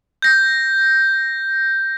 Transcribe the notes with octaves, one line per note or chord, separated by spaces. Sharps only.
G6 A#6